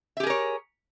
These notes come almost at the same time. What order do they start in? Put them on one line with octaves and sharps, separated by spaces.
E5 G4 G#4 A#4 C#5